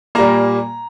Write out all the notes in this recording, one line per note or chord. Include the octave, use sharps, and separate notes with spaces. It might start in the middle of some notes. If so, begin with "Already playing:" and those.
A#2 G3 A#3 A#5